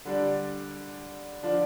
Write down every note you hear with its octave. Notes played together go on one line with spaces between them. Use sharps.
D3 G3 D4
D3 F3 D4 F4